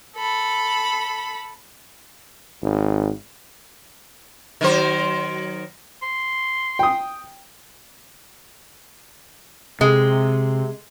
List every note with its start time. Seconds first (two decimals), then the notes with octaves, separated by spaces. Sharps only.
0.14 A4 B5
2.62 G#1
4.61 D#3 F#3 C5
6.02 C6
6.79 G5 D#6
9.81 C3 G#3